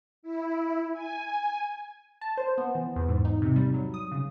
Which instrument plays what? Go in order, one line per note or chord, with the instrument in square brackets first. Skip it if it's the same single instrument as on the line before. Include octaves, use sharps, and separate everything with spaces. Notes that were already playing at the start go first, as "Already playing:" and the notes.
[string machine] E4
G#5
[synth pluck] A5
C5
B3
E3
E2
G#2
D#4
C3
G3
F#3
D#6
C#3